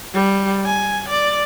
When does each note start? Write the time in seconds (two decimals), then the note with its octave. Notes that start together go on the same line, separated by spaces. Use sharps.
0.14 G3
0.65 G#5
1.09 D5